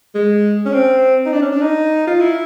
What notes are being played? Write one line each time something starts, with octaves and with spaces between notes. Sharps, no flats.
G#3
C#4
C4
D#4
D4
C#4
D4
D#4
F4
E4